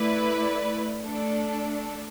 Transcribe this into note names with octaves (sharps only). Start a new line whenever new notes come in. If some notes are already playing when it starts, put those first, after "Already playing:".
Already playing: A3 E4 B4 D5
A3 D4 A4